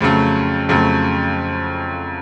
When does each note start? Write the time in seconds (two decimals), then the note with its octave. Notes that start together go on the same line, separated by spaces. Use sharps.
0.01 F2 C#3 F#3 A3
0.69 F2 C#3 F#3 A3